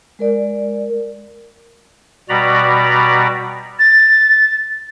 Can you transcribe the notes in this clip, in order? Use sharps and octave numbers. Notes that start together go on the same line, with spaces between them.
G#3 A#4 D5
B2 G3 F#4 D5 A#5 B5
A6